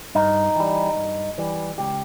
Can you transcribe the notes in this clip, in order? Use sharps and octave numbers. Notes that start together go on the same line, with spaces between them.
G2 D#4
E3 G3
G2
E3 G3
C#2 G4